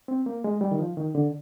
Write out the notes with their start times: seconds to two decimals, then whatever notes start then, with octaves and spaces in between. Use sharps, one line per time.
0.08 C4
0.26 A#3
0.44 G#3
0.61 G3
0.71 D#3
0.79 F3
0.97 D#3
1.15 D3